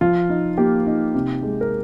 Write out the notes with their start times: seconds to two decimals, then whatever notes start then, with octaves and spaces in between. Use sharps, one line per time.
0.01 F3 F4
0.30 D#4
0.58 A#3 G4
0.86 D#4
1.15 C3
1.43 G#3
1.61 A#4